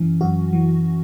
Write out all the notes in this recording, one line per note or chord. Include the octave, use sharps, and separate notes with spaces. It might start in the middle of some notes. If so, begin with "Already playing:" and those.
Already playing: F#2 E3 C#4
F#2 F#4
E3